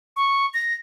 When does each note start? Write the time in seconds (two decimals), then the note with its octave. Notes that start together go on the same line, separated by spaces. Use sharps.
0.16 C#6
0.54 A#6